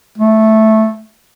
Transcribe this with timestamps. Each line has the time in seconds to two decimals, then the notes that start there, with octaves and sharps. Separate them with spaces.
0.18 A3